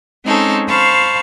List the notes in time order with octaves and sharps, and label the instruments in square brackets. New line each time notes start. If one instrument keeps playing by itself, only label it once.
[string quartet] G#3 C4 C#4 D#4 A4
C5 F5 A5 B5 C#6